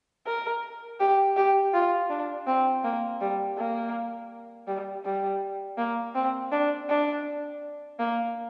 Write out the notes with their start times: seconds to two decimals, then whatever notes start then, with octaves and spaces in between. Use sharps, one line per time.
0.27 A#4
1.00 G4
1.37 G4
1.74 F4
2.10 D4
2.47 C4
2.84 A#3
3.21 G3
3.58 A#3
4.68 G3
5.05 G3
5.78 A#3
6.15 C4
6.52 D4
6.89 D4
7.99 A#3